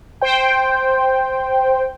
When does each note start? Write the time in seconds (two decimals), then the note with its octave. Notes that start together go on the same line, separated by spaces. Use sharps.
0.21 C5 G5